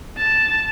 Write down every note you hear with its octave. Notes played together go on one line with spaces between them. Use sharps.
A5